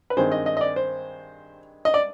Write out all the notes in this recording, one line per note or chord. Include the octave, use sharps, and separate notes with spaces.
B4
G2 D#3 G#3 C4 C5
D#5
D#5
D#5
D5
C5
D#5
D5